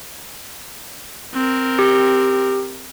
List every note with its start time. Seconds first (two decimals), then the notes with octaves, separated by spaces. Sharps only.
1.34 C4 A#4
1.79 G4